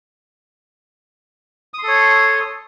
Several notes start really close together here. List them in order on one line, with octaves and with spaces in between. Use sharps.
D#6 C6 A4 C#5